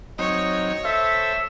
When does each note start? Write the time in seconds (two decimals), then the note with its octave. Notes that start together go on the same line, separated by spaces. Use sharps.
0.19 F#3 C4 D#4 C#5 D#5
0.85 A4 C5 E5